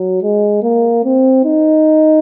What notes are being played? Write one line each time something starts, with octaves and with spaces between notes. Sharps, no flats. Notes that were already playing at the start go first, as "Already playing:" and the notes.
Already playing: F#3
G#3
A#3
C4
D#4